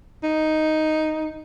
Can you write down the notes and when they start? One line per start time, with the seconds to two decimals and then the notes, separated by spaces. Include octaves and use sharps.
0.23 D#4